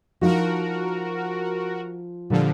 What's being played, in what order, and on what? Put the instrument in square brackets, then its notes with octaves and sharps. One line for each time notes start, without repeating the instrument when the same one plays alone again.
[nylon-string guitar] F3 D#4 [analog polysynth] F#4 A#4
[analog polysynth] A#2 D3 F3 [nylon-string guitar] G3